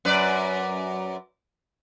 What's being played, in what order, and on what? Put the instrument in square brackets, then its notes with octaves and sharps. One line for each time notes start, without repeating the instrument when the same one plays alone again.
[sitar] F#2 B4 D5